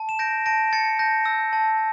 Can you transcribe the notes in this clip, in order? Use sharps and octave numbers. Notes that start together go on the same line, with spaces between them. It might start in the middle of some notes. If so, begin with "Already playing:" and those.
Already playing: A5
E7
G6 A#6 D7
A5 A#6 D7
A5 A6 C#7
A5 G6 A#6
E6
A5